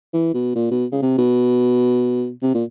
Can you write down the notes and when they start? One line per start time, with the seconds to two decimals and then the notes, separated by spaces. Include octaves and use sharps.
0.13 E3
0.34 B2
0.55 A#2
0.71 B2
0.92 C#3
1.02 C3
1.18 B2
2.42 C3
2.54 A#2